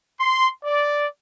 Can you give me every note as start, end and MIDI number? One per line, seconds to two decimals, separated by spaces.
0.20 0.48 84
0.64 1.06 74